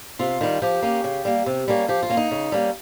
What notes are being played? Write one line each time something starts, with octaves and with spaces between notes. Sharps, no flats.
C3 F4
D#3 G3
F3 G4
A#3 C#4
C#3
G3 A#3
C3
G3 A#3 C#4
F3 G4
F4
A#3 C#4
D#4
C#3
G3 A#3 C#4